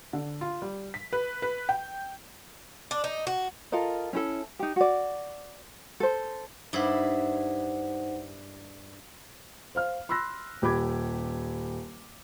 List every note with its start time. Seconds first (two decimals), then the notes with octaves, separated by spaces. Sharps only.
0.13 D3
0.41 F4
0.62 G3
0.94 B6
1.13 B4
1.42 B4
1.69 G5
2.91 D4
3.04 D#4
3.27 F#4
3.72 F4 A4 A#4 D#5
4.13 C#4 E4 A4
4.59 D#4 G4
4.76 F#4 D5
6.00 A4 C5
6.73 G2 D#4 E4 C5 F#5
9.75 C5 F5 F6
10.09 B5 C6 E6 F#6 A#6
10.62 D#1 G4 B5 D6 G#6